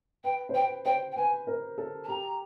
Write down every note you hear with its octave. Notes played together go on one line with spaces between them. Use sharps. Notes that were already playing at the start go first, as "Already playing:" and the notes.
B4 G5
C5
B4 G5
C5 G5
G5
B4 G#5
A#4
A4
A5
G4 A#5